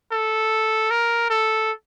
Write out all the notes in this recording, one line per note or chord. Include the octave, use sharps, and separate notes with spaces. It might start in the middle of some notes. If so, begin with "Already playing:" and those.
A4
A#4
A4